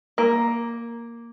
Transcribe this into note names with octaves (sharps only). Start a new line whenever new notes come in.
A#3